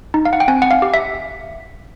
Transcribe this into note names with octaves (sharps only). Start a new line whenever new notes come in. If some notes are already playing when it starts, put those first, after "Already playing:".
D#4
F5
F#5
G5
C4 G#5
F#5
F5
G4
E5